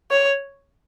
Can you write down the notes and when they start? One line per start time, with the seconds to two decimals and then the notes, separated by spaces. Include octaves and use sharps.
0.11 C#5